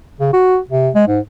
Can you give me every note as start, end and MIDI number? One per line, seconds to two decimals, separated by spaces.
0.20 0.32 49
0.33 0.58 66
0.70 0.90 48
0.95 1.04 56
1.07 1.19 44